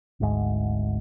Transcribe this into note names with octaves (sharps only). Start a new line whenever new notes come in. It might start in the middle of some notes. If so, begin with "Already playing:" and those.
G#1 D2 G#2 G#3